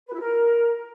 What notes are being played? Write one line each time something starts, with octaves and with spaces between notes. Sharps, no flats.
B4
E4
A#4